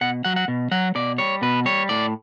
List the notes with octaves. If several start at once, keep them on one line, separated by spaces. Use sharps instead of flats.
B2 F#5
F#3 F#5
F#5
B2
F#3 F#5
B2 D5
G3 C#5
B2 B4
G3 C#5
A2 D5